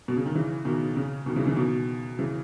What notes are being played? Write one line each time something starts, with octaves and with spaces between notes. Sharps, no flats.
B2
C#3
D#3
C#3 E3
B2 D#3
C#3
B2 D#3
C#3 E3
C#3 E3
B2 D#3
C#3 E3